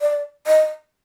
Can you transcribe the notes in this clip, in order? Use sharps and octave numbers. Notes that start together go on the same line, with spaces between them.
D5
D#5